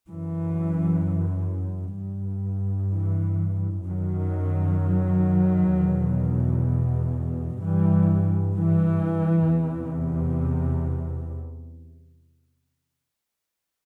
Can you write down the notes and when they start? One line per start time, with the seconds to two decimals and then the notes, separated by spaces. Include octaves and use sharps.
0.10 F#2 E3
1.98 G2
2.92 E3
3.86 F#2 D#3 F#3
5.74 E2 B2
7.62 G2 E3 G3
8.56 E3
9.50 E2 C3